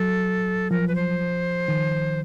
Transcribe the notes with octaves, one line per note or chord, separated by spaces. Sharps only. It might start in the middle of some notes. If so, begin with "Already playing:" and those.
Already playing: F#3 A4
F3 A#4
B4
C5
D#3